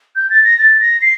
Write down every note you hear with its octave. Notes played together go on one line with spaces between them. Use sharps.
G6
A6
A#6
A6
A#6
C7